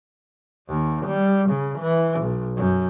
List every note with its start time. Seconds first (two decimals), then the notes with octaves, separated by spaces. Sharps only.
0.68 D#2
1.07 G3
1.50 C#3
1.79 E3
2.21 B1
2.57 F#2